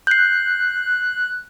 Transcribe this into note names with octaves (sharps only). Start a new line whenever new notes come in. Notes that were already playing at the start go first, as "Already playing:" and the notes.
F#6 G6 C7